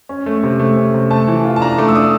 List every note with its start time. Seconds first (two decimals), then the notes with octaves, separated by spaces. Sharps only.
0.09 C#4
0.26 A3
0.43 C3
0.60 A3
0.77 C#4
0.94 C3
1.11 A3 A5
1.28 E3
1.45 F4
1.56 A5
1.61 D4 A#5
1.78 A3 D6
1.88 E6
1.95 D4 D#6